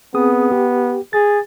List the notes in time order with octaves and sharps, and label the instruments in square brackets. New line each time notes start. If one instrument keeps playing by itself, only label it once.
[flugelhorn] B3 [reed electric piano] C4 G#4 D#6
[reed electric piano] G4
[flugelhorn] G#4 [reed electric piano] A6